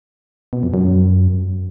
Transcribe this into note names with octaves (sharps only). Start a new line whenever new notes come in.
B2
F2
F#2